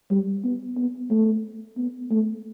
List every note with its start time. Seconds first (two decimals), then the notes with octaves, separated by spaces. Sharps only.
0.11 G3
0.44 B3
0.77 B3
1.11 A3
1.77 B3
2.11 A3